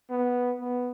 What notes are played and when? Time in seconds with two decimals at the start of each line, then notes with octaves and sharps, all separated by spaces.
0.10 B3
0.60 B3